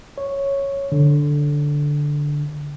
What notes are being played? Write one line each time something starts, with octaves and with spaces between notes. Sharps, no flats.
C#5
D3